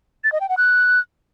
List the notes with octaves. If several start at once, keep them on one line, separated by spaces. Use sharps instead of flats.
A6
D#5
G5
F#5
F#6